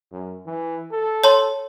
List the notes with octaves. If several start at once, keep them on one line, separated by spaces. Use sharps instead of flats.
F#2
E3
A4
C#5 A5 C6